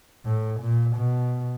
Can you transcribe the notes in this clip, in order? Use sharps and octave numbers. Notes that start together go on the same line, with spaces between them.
A2
A#2
B2